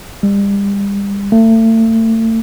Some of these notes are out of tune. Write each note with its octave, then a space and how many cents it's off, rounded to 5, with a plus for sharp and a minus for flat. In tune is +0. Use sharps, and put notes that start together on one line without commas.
G3 +35
A3 +35